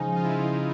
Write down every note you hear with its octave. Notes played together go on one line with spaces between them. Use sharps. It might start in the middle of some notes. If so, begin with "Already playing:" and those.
Already playing: C#3 F3 G#3 C#4 D#4
F4
E4
F4